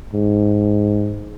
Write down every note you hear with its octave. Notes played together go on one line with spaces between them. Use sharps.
G#2